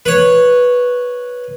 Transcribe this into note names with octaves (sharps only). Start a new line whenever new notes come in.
B4 C#5